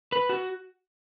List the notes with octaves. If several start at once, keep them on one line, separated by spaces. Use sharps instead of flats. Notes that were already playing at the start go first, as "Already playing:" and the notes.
B4
F#4